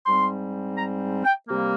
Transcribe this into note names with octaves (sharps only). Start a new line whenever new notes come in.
G#2 G3 C4 C6
A#5
G5
C3 G3 A#3